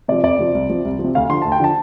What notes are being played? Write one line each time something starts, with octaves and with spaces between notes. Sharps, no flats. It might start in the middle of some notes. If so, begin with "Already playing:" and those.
C3 F3 D5
F2 D5
C3 F3
C2
C3 F3
C2
F3
C3
D2 F5
D3 F3 C6
D2 A5
G5
D3 F3 A5